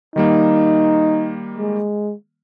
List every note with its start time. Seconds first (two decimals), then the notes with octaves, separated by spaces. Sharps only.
0.16 D#3 G3 A#3 D#4
1.58 G#3